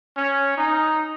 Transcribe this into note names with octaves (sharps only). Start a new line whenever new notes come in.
C#4
D#4